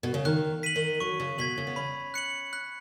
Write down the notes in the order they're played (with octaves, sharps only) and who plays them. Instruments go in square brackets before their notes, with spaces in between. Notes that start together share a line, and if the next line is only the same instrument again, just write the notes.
[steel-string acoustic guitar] B2
C#3
[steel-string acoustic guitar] D#3 [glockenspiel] F#6
[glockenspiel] B6 D#7 F#7
[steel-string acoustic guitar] D#3
[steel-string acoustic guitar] F#3 [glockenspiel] C#6
[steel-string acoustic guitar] C#3
[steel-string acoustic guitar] B2 [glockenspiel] G#6 B6 F#7
[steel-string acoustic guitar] C#3
B3
[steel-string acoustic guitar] C#4 [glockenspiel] B5
[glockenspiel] F#6 C#7 F#7
F#6